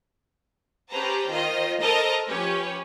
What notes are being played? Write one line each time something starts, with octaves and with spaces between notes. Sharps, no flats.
C#4 G4 B4 C5 A5 A#5
D#3 F4 C5 D#5
A4 A#4 C5 D#5 A5 A#5
F3 C#4 G4 B4 C#5